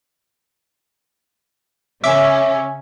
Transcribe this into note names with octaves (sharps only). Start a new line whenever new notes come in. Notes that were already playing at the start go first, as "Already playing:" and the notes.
C#3 C#4 E5 D6 E6